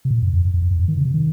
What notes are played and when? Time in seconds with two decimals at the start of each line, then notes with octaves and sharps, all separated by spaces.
0.05 C3
0.11 A#2
0.22 F#2
0.33 F2
0.45 F#2
0.54 F2
0.62 F#2
0.71 F2
0.79 F#2
0.88 D#3
0.97 C#3
1.05 C3
1.14 D#3